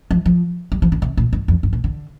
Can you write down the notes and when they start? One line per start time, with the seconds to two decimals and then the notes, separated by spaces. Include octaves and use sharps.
0.11 F3
0.26 F3
0.72 G3
0.82 F3
0.92 D3
1.02 C3
1.17 A#2
1.33 G2
1.48 F2
1.63 G2
1.73 A#2
1.84 D3